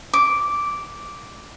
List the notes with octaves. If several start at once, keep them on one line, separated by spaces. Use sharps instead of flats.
D6